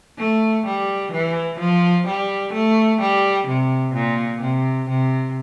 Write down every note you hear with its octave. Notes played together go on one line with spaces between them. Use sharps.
A3
G3
E3
F3
G3
A3
G3
C3
A#2
C3
C3